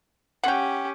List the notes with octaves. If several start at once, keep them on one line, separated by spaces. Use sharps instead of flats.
C#4 G4 F#5 G5